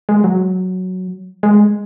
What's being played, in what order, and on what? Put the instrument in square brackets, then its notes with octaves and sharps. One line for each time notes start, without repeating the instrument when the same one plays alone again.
[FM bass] G#3
F#3
G#3